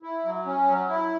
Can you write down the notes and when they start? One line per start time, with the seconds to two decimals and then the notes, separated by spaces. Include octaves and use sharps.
0.03 E4
0.24 F#3
0.46 C#4
0.68 F#3
0.89 E4